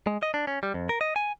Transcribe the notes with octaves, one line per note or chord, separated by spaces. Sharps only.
G#3
D#5
D4
C#4
G3
F2
A#4
D#5
G#5